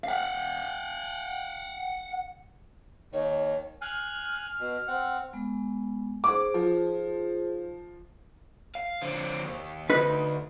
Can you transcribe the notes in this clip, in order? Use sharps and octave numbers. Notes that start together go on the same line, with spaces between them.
F5 F#5
D#2 D#3 C#5
G#5 F6 F#6
F6
B2
C4 F#5
G#3 B3
D#4 G#4 C5 D6
F3
F5
D3 C4
D#2
D2 D#4 B4